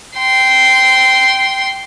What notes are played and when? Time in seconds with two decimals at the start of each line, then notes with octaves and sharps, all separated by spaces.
0.16 G5 C6